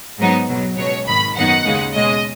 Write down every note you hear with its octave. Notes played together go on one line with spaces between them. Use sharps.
G#2 F#3 B3 D#4
B1 B2 F#3
C#2 B2 F#3 C#5
G#1 G#2 D#3 B5
F#2 D#3 F#3 B3 D#4 F#5
D#2 C#3 G#3 D#4
B2 G#3 C#4 D#5